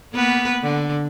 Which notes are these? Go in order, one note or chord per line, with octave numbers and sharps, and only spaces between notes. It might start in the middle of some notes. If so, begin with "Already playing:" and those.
A#3 B3 B4
D3